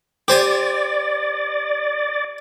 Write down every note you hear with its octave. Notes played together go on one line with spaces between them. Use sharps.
G4 C5 D5 G#5